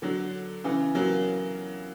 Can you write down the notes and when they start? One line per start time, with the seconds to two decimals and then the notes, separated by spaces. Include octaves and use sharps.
0.02 D3 F#3
0.64 C#3 E3
0.95 F#3 A#3